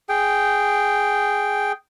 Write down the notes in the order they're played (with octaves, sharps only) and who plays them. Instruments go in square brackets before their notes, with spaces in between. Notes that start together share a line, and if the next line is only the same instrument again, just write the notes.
[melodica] G#4 G5